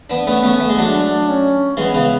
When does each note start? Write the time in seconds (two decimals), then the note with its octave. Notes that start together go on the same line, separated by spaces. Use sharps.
0.10 B3 D4
0.27 A3 B3 C#4
0.43 A3 C#4
0.60 A3
0.70 G#3
0.77 F#3 A3 D4
1.27 C#4
1.77 E3 G#3 B3
1.94 C#3 E3